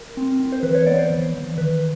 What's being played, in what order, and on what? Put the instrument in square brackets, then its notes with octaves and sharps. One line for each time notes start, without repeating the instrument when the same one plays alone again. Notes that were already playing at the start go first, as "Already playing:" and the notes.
Already playing: [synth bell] A#4
C4
C4
C5
E3 B4
C#5
B3 D5
C5
E3
E3
D#3 B4